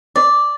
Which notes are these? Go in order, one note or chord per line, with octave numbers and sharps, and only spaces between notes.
D5